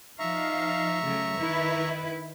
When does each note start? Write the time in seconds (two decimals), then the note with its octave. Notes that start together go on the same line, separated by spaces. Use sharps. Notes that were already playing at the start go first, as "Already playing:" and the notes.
0.19 F3 D#4 E5 F5 A#5 C#6
1.04 C#3 F#3 A3
1.39 D#3 E4 B4